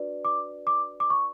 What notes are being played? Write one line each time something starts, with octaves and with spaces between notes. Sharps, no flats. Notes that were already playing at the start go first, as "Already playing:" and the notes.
Already playing: D4 F#4 B4 D5
D6
D6
D6
C#6